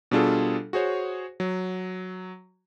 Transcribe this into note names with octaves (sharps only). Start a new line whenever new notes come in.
B2 G3 D4 F4 G#4 A4
F#4 G#4 C5 C#5
F#3